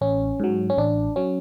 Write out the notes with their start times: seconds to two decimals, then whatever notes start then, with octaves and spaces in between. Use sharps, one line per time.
0.01 A1 C#4
0.40 G#2 F#3
0.70 C#4
0.78 A1 D4
1.16 F#3 C#4